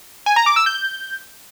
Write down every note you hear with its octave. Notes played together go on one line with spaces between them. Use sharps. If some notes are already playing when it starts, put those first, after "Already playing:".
G#5
A#5
D6
E6
G6